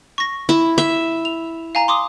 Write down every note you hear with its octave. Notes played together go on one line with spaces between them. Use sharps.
C#6 A#6
E4
E5
F7
F5 G#5 A#5
C6 D6 D#6